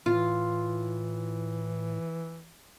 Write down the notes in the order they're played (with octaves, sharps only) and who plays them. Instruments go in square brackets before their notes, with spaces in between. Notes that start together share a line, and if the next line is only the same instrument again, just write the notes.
[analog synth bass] A2 [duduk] E3 [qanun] F4